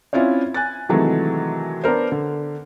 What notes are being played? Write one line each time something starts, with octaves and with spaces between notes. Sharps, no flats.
C4 C#4 E4 F4 C#5 D5
G#5 F#6 A6
C3 D#3 E3 F#3 G#3 A3
B3 D4 A#4 C5
D3